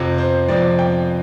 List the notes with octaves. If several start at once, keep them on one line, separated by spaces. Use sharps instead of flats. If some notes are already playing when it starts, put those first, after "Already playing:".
Already playing: F2 C3 F3
C5
F2 C3 F3 D5
G5